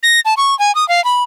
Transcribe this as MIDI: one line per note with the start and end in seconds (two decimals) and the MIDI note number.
0.03 0.20 94
0.25 0.34 81
0.37 0.57 85
0.59 0.74 80
0.75 0.87 87
0.88 1.03 77
1.04 1.23 83